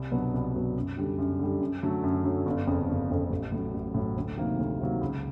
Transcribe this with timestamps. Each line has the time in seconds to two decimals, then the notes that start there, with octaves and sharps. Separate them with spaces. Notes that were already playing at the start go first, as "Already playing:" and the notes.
Already playing: C2
0.11 B2 F#3 B3 D4
0.34 C2
0.55 B2 F#3 B3 D4
0.76 F#2
0.97 D3 G3
1.18 F#2
1.39 D3 G3
1.61 F#2
1.82 D3 F#3 A3
2.04 F#2
2.24 D3 F#3 A3
2.46 G1
2.67 F2 C#3
2.89 G1
3.10 F2 C#3
3.30 A1
3.52 A2 F#3
3.74 A1
3.94 A2 F#3
4.16 D2
4.37 C3 D#3 F#3 A#3
4.59 D2
4.80 C3 D#3 F#3 A#3
5.01 C#2